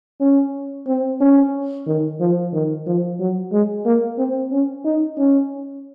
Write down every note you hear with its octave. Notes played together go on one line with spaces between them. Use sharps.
C#4
C4
C#4
D#3
F3
D#3
F3
F#3
G#3
A#3
C4
C#4
D#4
C#4